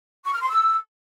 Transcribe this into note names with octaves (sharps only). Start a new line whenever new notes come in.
C#6
F6
C6
E6